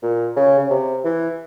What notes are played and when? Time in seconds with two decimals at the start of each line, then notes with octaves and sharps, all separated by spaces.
0.03 A#2
0.36 C#3
0.59 C#3
0.70 C3
1.04 E3